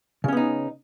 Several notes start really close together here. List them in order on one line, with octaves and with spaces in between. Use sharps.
C#3 C#4 B3 D#4